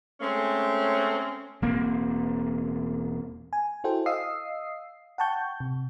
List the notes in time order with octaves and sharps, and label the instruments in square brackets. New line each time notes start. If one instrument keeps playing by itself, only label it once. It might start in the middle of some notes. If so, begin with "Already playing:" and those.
[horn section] G#3 A3 C4 C#4
[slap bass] E1 A#3 C4
[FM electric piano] G#5
E4 F#4 A4 C5 G5
D#5 F5 D#6 E6 C7
F#5 G5 A5 C#6 G6
C3